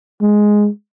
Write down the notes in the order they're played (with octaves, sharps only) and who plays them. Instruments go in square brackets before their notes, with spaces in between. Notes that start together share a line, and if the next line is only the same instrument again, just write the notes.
[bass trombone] G#3